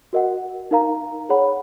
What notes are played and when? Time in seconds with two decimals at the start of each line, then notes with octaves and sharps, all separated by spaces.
0.13 F#4 A#4 D#5 F#5
0.71 D#4 A#4 F5 A#5
1.29 G#4 C#5 F#5 B5